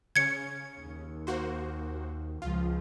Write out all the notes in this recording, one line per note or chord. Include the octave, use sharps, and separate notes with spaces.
C#3 C#4 G#6 C#7
D#2
A#3 F#4 C5
C#2 F3 F4